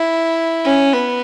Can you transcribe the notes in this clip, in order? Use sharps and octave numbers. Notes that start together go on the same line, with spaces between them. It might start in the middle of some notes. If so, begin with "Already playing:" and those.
Already playing: E4
C#4
B3